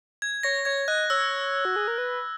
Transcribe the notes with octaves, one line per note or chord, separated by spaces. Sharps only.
G#6
C#5 A#6
C#5 G#6
D#5 F#6
C#5 E6
F#4
G#4
A#4
B4